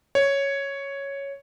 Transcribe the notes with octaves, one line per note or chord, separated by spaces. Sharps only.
C#5